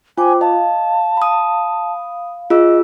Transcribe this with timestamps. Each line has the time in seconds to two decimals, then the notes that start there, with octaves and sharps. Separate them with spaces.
0.18 F4 C5 G5 G#5 D6
0.41 D#5 F5 A5
1.17 B5 D#6
2.50 F4 G#4 D#5 E6